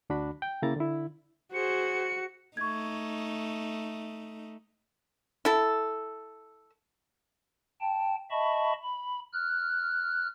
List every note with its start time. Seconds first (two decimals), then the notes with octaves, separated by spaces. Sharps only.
0.10 D2 D4 F#4 B5
0.42 G5
0.62 C#3 A#3 E4 A#5 A6
0.76 D3 E4
1.54 F#4 G#4 C5 C#7
2.57 A3 D#4 C#6 G#6
5.45 E4 A4
7.81 G5 A5
8.31 D#5 E5 A5 B5 C#6
8.83 B5
9.33 F6 F#6